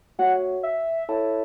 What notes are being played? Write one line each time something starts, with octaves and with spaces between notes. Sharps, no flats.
A3 F#4 C#5 F#5
E5
E4 A4 C#5 E5 A5